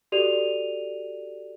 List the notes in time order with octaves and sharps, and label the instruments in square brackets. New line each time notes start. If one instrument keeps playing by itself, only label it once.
[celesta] F#4 G4 A4 D5 D#7 F7